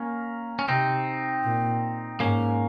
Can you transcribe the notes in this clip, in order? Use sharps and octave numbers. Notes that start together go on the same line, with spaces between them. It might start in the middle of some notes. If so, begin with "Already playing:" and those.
Already playing: A#3 C#4
C#4
C3 C4 D#4
A#2
G#2 A#3 C#4